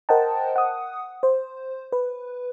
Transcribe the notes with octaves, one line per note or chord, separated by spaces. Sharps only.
A#4 C5 D#5 F#5 G5 A5
F#5 D#6
C5
B4